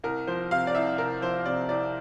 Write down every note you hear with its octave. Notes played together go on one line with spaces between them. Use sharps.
C2 A#4
F3 C5
C3 F5
D5
C2 E5
C2 A#4
F3 C5
C3 D5
C2 D5